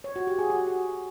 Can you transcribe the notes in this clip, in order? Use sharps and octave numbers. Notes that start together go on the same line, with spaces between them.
C#5
F#4
G4
G#4
F#4